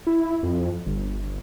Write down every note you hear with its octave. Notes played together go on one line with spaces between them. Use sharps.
E4
F2
G1